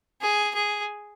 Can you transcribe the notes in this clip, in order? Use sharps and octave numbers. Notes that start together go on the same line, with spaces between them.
G#4
G#4